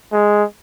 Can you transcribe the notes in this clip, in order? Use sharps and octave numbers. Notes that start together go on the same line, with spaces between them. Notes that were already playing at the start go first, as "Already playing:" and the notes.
G#3